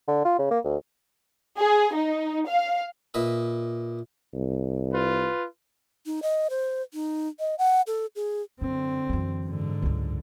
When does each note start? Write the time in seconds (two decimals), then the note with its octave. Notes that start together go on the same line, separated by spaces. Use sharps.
0.08 D3
0.25 F4
0.39 C#3
0.51 A#3
0.64 D2
1.58 G#4
1.95 D#4
2.48 F5
3.14 A#2 B4 D#5 E5
4.34 C2
4.93 F4 B4
6.06 D#4
6.23 D#5
6.50 C5
6.94 D#4
7.39 D#5
7.59 F#5
7.87 A4
8.16 G#4
8.61 F#2 D3 C4
9.09 F#2 E3
9.46 G#2 D3
9.82 C#2 F#2